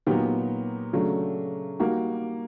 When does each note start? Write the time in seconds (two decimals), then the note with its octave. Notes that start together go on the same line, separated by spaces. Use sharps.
0.06 A#2 F#3 B3 D#4 G4
0.93 C#3 F#3 A3 D4
1.80 G3 A#3 D#4 F#4